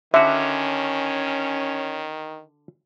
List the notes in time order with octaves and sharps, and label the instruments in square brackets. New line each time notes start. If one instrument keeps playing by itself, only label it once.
[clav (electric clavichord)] D3 F#4 [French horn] D#3 [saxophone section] C#4 [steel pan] E5